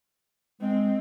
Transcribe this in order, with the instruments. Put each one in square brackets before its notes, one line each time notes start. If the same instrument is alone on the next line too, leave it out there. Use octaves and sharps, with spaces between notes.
[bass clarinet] G#3 [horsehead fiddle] C4